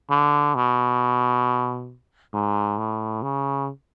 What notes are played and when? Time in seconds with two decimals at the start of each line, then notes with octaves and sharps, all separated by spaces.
0.10 D3
0.55 B2
2.33 G#2
2.78 A2
3.22 C#3